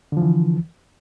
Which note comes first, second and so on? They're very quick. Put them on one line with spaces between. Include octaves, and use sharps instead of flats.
D3 F3 E3